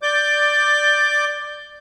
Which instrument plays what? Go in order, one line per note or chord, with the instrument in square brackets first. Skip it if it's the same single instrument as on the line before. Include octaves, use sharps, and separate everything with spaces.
[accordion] D5 D6 G6